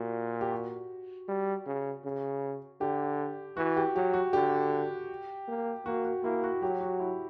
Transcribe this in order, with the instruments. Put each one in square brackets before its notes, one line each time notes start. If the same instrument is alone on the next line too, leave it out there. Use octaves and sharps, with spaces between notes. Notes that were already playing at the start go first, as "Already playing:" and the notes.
Already playing: [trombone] A#2 [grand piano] F#4
[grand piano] G4
F#4
[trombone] G3
C#3
C#3
[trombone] D3 [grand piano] G4
[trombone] E3 [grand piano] F#4
[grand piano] G4
[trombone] F#3 [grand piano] G4
[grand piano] F#4
[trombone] D3 [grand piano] G4
[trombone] A#3
[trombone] A#3 [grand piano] F#4
[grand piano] F#4
[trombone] A#3 [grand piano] E4
[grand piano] F#4
[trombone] F#3 [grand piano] G4
[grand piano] F#4
E4